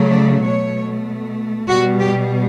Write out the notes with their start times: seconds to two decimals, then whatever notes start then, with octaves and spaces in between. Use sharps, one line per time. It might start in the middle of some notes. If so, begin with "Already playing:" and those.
Already playing: C#3 F#3 A3
0.11 D5
0.42 B2 A3 C#5
1.68 B2 G3 F#4
1.99 G4